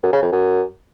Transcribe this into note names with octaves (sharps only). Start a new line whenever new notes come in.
F#2
C#3
F2
F#2